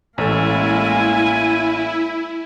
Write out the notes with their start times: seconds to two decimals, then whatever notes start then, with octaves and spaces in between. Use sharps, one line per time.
0.18 A1 G#3 A#3 E4 A4 G#5